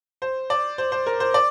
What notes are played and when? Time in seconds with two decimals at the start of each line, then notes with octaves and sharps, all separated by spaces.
0.22 C5
0.50 D5
0.78 C5
0.92 C5
1.06 A#4
1.20 C5
1.34 D5